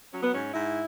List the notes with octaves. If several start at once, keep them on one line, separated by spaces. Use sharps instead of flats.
F#3 C#4
B3
G#2 C#4
G#2 E4